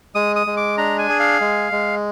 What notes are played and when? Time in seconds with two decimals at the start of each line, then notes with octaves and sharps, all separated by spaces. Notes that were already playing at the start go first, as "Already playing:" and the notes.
0.15 G#3 D#6
0.36 D#6
0.47 G#3
0.57 D6
0.78 D4 A#5
0.99 G#5
1.09 G#4
1.20 F5
1.41 G#3
1.72 G#3